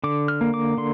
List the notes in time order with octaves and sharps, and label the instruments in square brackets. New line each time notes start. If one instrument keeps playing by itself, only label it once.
[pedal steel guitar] D3 D6
F6
A#3
D6
D3 C6